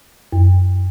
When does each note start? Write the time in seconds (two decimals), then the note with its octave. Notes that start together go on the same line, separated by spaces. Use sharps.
0.33 F#2